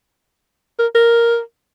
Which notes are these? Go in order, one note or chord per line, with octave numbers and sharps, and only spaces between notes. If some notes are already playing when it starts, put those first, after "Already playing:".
A#4
A#4